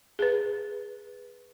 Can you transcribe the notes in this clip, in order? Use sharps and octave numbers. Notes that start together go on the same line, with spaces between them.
G#4 B4